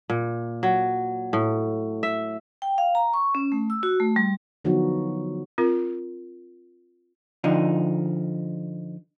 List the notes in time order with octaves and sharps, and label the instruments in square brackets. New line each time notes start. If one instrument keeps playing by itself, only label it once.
[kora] A#2
F#3
A2
E5
[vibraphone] G5
F5
A#5
C#6
C#4
A3
E6
F#4
A3
G3
[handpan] D3 F3 F#3 B3 D#4 F#4
[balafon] C4 F4 A#4
[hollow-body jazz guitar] D3 F3 D#4